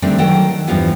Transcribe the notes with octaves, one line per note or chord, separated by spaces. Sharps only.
D3 D#3 G3 A3 C4 D4
D#3 F#3 A4 F#5 G5
E2 G2 E3 F3 G3 B3